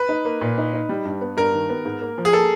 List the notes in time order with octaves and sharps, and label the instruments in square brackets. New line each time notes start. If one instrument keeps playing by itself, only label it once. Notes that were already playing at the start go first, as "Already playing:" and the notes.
Already playing: [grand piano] B4
[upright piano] D#4
A#3
A#2
D#4
D#4
G3
G2
B3
[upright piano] G2 [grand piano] A#4
[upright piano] D#3
B3
G#2
A#3
F3
[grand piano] G#4
[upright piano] A#3 [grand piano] A4